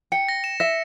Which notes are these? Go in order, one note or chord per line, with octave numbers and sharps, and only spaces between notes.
G5 C#7
A#6
E7
E5 A#6